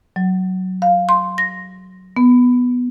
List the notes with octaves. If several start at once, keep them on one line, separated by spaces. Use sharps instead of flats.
F#3
F5
C6
A#6
B3